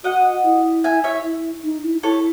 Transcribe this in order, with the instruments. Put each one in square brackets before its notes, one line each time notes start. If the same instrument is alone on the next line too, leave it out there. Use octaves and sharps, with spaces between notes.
[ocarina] F#4 [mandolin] D#5 F#5
[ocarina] E4
[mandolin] E5 G#5
C#5 E5
[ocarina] E4
D#4
E4
[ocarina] E4 [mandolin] A4 C#5